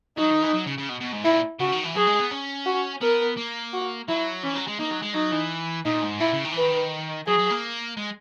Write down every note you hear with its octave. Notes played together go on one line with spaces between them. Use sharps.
F#3 D#4
D#3
E3
F#3
C#3
C#3
B2
B2
G#2
A#2 E4
C#3 F#4
D#3
E3
F#3 G#4
G#3
B3
C#4
F#4
B3 A#4
A#3
F#4
F#3 E4
E3 C#4
F#3
G#3
A#3 D#4
F#3
G#3
F#3 D#4
E3
A#2 D#4
G#2
A#2 E4
C#3
D#3
E3
D#3 B4
F#3 G#4
F#3
A#3
G#3